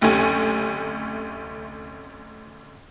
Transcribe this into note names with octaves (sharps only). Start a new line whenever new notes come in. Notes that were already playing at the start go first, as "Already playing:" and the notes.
F#1 D2 C3 A3 C#4 G#5